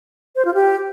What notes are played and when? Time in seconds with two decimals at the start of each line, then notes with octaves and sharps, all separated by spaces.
0.36 C5
0.45 F4
0.54 G4